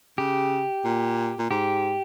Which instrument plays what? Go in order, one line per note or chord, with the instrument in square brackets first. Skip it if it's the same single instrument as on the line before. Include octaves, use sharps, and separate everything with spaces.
[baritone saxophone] C#3 [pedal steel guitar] G4
[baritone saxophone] A#2
A#2
[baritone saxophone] G#2 [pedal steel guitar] G4